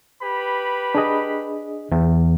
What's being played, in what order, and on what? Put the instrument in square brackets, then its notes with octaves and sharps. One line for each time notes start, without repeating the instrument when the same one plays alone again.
[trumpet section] G4 B4 B5
[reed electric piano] D4 G#4 D#5
[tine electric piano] E2